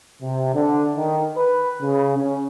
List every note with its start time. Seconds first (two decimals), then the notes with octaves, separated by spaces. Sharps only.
0.22 C3
0.53 D3
0.97 D#3
1.37 B4
1.81 C#3
2.17 C#4